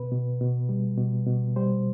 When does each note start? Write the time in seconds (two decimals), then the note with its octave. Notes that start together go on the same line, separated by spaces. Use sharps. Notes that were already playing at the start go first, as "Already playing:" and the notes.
Already playing: B2 B4
0.12 B2
0.41 B2
0.69 G3
0.98 B2
1.26 B2
1.56 G3 C5